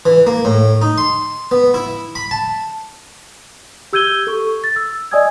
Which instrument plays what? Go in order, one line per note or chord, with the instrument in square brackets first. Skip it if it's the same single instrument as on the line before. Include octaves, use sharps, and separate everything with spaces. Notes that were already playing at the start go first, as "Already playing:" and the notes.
[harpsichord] E3
A#3
A2
D#4
C6
B3
E4
B5
A5
[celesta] G4 E6 G6 G#6 D#7 G7
A4 C#6
A6
E6
D5 D#5 G#5 D#6 E6 G#6